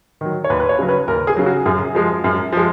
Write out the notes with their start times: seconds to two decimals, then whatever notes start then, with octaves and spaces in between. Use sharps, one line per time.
0.21 D#3 F#3
0.44 C#5
0.50 D#2 B4
0.60 B4
0.69 C#5
0.79 C#3 F#3
0.89 B4
1.08 D#2 A#4
1.27 G#4
1.37 C#3 F#3
1.46 F#4
1.66 F#2 G#4
1.95 F3 G#3
2.24 F#2
2.52 F3 G#3